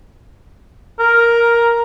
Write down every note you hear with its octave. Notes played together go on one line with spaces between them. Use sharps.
A#4